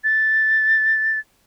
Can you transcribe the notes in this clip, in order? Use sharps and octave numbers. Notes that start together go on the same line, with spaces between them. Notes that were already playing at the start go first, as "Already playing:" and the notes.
A6